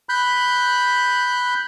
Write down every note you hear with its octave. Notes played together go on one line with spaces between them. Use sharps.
B5 F#6 G6